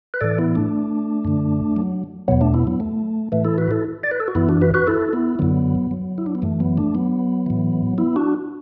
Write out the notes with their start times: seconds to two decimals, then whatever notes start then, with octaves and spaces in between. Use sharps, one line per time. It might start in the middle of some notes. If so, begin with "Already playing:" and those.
0.14 B4
0.21 A2 E3 A4 D5
0.38 B3 E4
0.55 A3 D4
1.25 F#2 D3
1.76 F#3
2.28 E2 B2 F#3 B3
2.41 A3 D4
2.54 B3 E4
2.67 F#3 B3
2.80 A3
3.32 A2 E3 A3
3.45 E4 A4
3.58 F#4 B4
3.71 E4 A4
4.03 D5
4.11 B4
4.20 A4
4.28 F#4
4.35 F#2 E3 B3 E4
4.49 D4 F#4
4.61 F#4 B4
4.74 F#4 B4
4.87 E4 A4
5.13 B3 E4
5.39 F#2 D3 F#3 B3
5.91 F#3
6.18 E4
6.26 D4
6.35 B3
6.42 F#2 E3 A3
6.60 F#3 B3
6.77 A3 D4
6.95 F#3 B3
7.46 A2 E3
7.98 B3 E4
8.16 D4 F#4